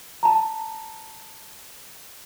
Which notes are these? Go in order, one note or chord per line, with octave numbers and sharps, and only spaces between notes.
A5 A#5